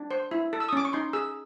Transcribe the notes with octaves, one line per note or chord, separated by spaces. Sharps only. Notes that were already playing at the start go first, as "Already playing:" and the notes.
Already playing: D4
C5
E4
A4
E6
D#6
C#4 D6
C#6
D#4 C6
G#4 E6